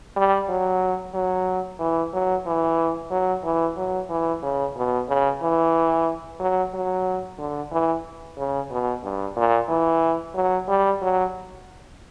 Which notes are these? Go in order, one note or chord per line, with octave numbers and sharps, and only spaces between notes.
G3
F#3
F#3
E3
F#3
E3
F#3
E3
F#3
E3
C#3
B2
C#3
E3
F#3
F#3
D3
E3
C#3
B2
G2
A#2
E3
F#3
G3
F#3